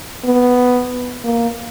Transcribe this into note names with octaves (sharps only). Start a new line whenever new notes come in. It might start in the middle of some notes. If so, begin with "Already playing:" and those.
B3
A#3